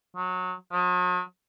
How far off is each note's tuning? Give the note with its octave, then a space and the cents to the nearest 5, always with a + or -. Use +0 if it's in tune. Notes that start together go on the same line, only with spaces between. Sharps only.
F#3 -20
F#3 -45